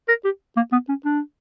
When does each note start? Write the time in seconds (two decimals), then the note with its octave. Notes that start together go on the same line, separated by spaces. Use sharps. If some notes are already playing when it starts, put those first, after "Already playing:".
0.08 A#4
0.25 G4
0.57 A#3
0.72 B3
0.89 C#4
1.05 D4